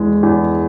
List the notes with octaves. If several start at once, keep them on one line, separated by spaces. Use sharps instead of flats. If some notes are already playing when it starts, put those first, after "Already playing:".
Already playing: E2 G#3
E2